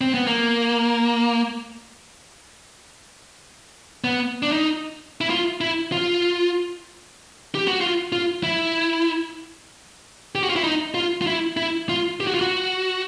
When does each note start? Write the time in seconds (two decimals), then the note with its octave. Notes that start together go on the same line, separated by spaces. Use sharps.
0.01 C4
0.14 B3
0.27 A#3
4.04 B3
4.43 D4
4.52 D#4
5.21 E4
5.30 F4
5.61 E4
5.92 F4
7.55 G4
7.68 F#4
7.81 F4
8.12 F4
8.43 E4
10.35 G4
10.43 F#4
10.50 F4
10.56 E4
10.64 D#4
10.94 F4
11.22 F4
11.27 E4
11.57 E4
11.89 F4
12.20 G4
12.27 F#4
12.34 F4
12.41 F#4